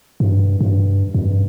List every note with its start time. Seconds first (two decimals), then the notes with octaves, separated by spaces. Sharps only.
0.20 G2
0.61 G2
1.14 F2
1.22 G2